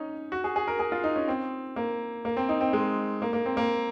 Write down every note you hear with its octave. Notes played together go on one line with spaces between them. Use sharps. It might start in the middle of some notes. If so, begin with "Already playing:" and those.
Already playing: C#4 D#4
F#4
G#4
G#4
A#4
G#4
F4
D#4
C#4
C4
A#3
A#3
C4
D#4
C4
G#3
A#3
A#3
C4
A#3